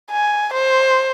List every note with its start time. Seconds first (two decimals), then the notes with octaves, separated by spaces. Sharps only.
0.11 G#5
0.54 C5